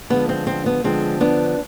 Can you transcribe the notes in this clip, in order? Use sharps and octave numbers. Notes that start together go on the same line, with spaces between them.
D3 F3 G#3 B3
C4
C4
B3
D3 F3 G#3 C4
B3 D4